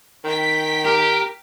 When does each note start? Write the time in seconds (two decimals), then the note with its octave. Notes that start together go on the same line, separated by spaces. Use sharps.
0.24 D#3 G5 B6
0.85 G4 A#4